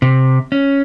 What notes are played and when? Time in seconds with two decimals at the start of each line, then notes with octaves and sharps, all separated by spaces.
0.02 C3
0.52 C#4